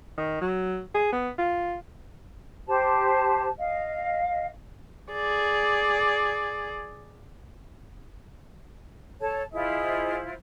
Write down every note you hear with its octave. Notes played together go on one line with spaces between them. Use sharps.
D#3
F#3
G#4
B3
F4
G4 C5 A5
D#5 F5
G#4 D5
A4 C#5 A5
E4 F4 G#4 C5 D#5